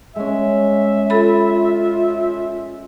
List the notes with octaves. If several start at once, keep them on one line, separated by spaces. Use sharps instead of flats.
G#3 C#4 E5
F4 A4 B5